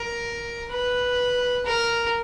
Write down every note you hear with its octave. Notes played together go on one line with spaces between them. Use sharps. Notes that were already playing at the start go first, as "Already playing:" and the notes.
Already playing: A#4
B4
A#4